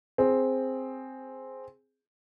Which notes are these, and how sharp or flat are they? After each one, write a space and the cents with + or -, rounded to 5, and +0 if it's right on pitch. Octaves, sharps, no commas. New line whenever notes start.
C4 +0 G#4 +0